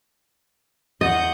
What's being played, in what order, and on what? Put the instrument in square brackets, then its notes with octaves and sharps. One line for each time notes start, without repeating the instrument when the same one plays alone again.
[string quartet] E2 F#5 G6 [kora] D#5